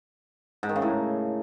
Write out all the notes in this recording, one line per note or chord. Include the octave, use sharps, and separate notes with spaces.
G#2
D#3
C#3
A2